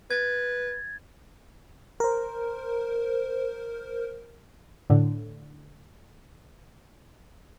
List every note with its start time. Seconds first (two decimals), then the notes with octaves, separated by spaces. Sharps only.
0.11 B4 G#6 A6
2.00 A#4 C5
4.90 A2 D3